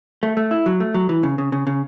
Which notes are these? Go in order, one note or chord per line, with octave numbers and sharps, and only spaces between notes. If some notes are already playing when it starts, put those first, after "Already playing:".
A3
A3
E4
F#3
A3
F#3
E3
C#3
C#3
C#3
C#3